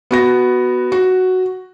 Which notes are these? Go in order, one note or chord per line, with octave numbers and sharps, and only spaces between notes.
B3 F#4 A#6
F#4